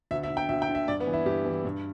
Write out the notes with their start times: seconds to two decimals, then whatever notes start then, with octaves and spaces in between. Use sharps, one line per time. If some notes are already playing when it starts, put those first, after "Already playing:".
0.11 D2 E5
0.23 E5
0.30 D3
0.37 G5
0.49 D2 E5
0.62 G5
0.68 D3
0.75 E5
0.88 G2 D5
1.00 B3
1.07 E3
1.13 E4
1.26 G2 G4
1.45 E3
1.65 G2